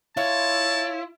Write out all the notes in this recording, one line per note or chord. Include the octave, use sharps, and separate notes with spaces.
E4 F4 C#5 A5